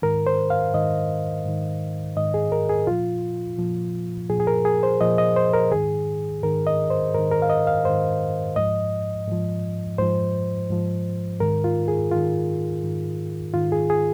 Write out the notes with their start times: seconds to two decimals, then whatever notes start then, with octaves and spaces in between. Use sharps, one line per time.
0.02 G#2 D#3 A#4
0.27 C5
0.50 F5
0.74 G#2 D#3 D#5
1.45 G#2 D#3
2.16 G#2 D#3 D#5
2.34 G#4
2.52 A#4
2.69 G#4
2.87 A#2 F3 F4
3.58 A#2 F3
4.30 A#2 F3 G#4
4.40 G#4
4.47 A#4
4.65 G#4
4.83 C5
5.01 A#2 F3 D#5
5.18 D#5
5.36 C5
5.53 A#4
5.72 G#2 D#3 G#4
6.43 G#2 D#3 A#4
6.67 D#5
6.90 C5
7.14 G#2 D#3 A#4
7.31 A#4
7.42 F5
7.50 D#5
7.67 F5
7.85 G#2 D#3 C5
8.56 G#2 F3 D#5
9.27 G#2 F3
9.98 G#2 F3 C5
10.70 G#2 F3
11.40 G#2 D#3 A#4
11.64 F4
11.88 G#4
12.11 G#2 D#3 F4
12.83 G#2 D#3
13.54 G#2 D#3 F4
13.72 G#4
13.90 G#4